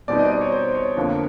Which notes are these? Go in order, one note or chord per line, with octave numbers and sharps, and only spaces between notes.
B2 G3 C4 D#4 D5
D#5
D5
D#5
C#5
C5
C#5
F2 D3 F3 A#3 D4